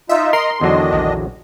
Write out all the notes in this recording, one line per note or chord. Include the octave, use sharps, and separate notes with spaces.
D#4 F4 E5
A#4 D#5 A#5 C6
E2 D3 D#3 F#3 D4 D#5
A#1